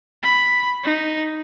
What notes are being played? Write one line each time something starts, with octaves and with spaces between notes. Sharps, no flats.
B5
D#4